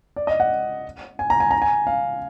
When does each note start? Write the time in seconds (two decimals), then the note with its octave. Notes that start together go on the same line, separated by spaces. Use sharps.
0.16 D5
0.27 D#5
0.40 F#5
1.19 G#5
1.30 A#5
1.40 G#5
1.51 A#5
1.62 G#5
1.87 F5